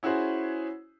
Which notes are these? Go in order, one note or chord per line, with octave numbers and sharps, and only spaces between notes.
C#4 E4 F#4 G#4 C5